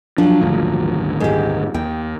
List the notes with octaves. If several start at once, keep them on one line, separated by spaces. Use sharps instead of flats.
F3 F#3 D4
D#1 G#1 D2
G#2 G4
D#2 G5